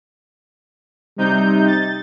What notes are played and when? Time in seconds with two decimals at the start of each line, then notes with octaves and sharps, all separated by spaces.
1.18 C3 G3 D#4 G6
1.67 A6